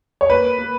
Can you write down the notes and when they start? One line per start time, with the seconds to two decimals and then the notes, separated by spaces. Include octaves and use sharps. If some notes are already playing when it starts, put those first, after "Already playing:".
0.21 C#5
0.30 A#3 B4
0.58 A#3